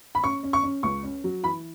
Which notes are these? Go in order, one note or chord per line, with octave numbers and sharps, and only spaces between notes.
B5
C#4 C#6
C#4
C#6
C#4
C#2 C#6
C#4
F#3
E3 B5